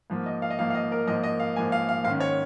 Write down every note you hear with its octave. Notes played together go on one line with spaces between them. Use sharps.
G#2 F3 A#3
D#5
F5
D#5
G#2 F3 A#3 F5
F5
D#5
A#4
G#2 F3 A#3 D#5
D#5
F5
G#2 F3 A#3 G#5
F5
F5
G#2 D#3 C#4 F5
C#5